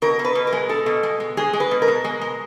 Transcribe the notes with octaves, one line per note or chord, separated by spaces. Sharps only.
B2 A#4
B2
B4
B2
A#4
G#3
G#3 A4
B2
G#3
G#3
G#3 G#4
G#3
B4
B2
A#4
B2
G#3
G#3